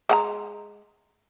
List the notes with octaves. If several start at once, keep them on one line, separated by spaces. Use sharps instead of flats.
G#3 F#5 A#5